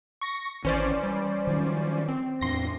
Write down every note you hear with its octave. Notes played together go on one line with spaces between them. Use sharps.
C#6 A#6
G#1 E3 C#4 C5 D5
G3
D#3 F3 F#3
C4
E2 A2 D4 C6 A#6